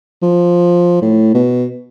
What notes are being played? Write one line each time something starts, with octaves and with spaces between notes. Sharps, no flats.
F3
A2
B2